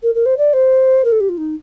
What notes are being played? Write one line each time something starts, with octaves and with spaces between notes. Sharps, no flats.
A#4
A#4
C5
D5
C5
A#4
A4
G4
F4
D#4